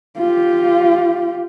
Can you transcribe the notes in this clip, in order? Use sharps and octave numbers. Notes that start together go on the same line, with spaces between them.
F4 G4